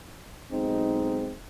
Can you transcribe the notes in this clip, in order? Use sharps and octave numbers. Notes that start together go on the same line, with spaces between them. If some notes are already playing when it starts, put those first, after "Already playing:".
B1 G#3 C4 D#4